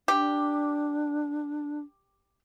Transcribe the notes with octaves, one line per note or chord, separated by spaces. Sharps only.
D4 G4